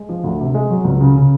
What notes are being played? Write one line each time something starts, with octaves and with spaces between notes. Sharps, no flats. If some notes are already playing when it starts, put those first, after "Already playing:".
Already playing: G#3
F3
D2
C3
G#3
F#3
C#2
C#3
C#3